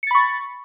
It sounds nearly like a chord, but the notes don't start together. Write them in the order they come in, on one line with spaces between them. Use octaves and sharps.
C#7 A6 B5 C#6